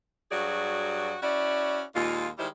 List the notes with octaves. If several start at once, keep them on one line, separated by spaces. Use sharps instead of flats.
G2 F#3 F#4 G#4 D5
C#4 E4 F#4 D5
D#2 A#2 G#3 F4
D#3 G3 G#3 E4 C5